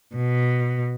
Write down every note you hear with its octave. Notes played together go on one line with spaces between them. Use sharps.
B2